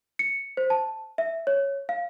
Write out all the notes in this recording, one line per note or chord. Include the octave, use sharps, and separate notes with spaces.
C#7
C5
A5
E5
C#5
F5